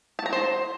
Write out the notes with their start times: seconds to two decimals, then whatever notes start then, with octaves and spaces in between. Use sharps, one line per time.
0.19 A5
0.26 A#5
0.33 C5